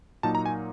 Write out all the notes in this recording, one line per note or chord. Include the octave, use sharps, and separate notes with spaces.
A#2 F#3 A#3 D#4 A5
A#5
G#5